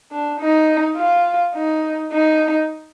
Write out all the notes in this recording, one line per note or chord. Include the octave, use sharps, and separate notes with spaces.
D4
D#4
F4
D#4
D#4